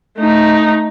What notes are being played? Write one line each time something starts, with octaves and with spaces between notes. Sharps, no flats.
A3 D#4